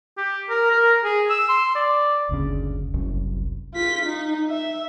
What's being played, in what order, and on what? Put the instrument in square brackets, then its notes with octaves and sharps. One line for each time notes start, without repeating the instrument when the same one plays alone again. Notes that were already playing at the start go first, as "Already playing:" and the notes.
[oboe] G4
A#4
A#4
G#4
E6
C6
D5
[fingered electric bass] F#1 D2 A2 C#3
F#1 C2 F#2
[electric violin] F4 B6
D#4
E5